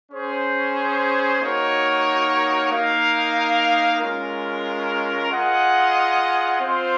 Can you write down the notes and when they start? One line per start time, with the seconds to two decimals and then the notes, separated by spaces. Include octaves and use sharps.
0.12 C#4 G#4 C5
1.41 A#3 D#4 F#4 A#4 C#5
2.71 A#3 D#4 A#4 F5
4.00 G#3 C#4 F4 A#4
5.29 F4 G#4 D#5 F#5
6.59 C4 F4 C5 F5